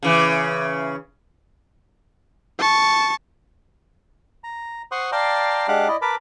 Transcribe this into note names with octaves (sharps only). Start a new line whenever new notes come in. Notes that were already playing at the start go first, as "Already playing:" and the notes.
C#3 E3
A5 C#6
A#5
C5 F#5 C6 C#6 D#6
D5 F5 G5 A5 A#5 C6
G#3 D4 G4 F5 F#5 D6
E4 D5 D#5
A#4 B4 A5 B5 D6